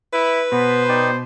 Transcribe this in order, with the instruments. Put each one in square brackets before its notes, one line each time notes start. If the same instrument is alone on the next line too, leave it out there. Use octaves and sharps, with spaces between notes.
[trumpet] E4 [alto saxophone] B4
[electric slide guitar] B2 [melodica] B3 [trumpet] C5
[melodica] D#4 D5 G5